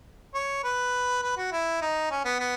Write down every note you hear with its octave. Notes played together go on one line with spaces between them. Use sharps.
C#5
B4
B4
F#4
E4
D#4
C#4
B3
B3